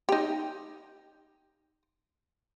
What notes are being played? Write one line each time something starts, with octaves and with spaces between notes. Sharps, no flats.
D#4 G4